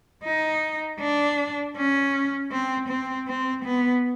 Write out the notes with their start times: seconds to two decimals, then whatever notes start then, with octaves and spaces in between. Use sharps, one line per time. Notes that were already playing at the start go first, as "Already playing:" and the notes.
0.25 D#4
1.01 D4
1.77 C#4
2.51 C4
2.89 C4
3.27 C4
3.64 B3